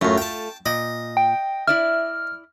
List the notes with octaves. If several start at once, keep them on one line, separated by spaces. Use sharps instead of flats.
F#2 A2 A3 F4
G5 A5
A#2 D#5
G5
E4 D5 E5 F6